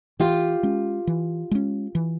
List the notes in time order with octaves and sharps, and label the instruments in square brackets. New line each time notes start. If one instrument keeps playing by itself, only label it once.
[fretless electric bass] E3 [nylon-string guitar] F4 G4
[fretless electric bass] G#3 C#4
E3
G#3 C#4
E3